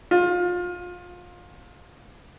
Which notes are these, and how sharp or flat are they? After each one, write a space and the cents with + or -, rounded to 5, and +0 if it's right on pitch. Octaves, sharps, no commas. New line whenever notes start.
F4 +25